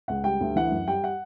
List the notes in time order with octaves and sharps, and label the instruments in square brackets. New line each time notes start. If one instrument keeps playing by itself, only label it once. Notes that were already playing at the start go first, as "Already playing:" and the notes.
[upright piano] C#2 F#5
G3 G5
D2
E3 F#5
F#2
G3 G5
F#5